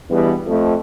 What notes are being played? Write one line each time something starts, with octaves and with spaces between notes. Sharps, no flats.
E2 G2 B2 E3 G3 B3
F2 A3